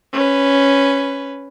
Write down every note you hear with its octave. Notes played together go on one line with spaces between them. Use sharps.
C#4 B4